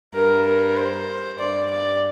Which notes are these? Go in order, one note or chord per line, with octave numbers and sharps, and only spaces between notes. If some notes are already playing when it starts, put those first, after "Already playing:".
G2 A#4
A#4
C5
G2 D5
D5